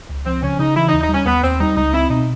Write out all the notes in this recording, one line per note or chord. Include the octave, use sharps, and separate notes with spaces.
C#2
F3 C4
C#3 C#4
C#3 D#4
E3 E4
D#4
D#2
D#4
G3 C#4
D#2 B3
D#2 C4
G3 D#4
C#2 D#4
C4 E4
B2 D#4